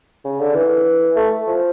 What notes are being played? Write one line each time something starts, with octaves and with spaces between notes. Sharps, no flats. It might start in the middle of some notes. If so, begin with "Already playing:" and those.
C#3
D3
E3
A3
F3